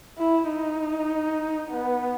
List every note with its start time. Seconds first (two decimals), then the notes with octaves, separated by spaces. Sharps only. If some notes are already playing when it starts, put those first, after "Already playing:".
0.19 E4
0.49 D#4
1.71 B3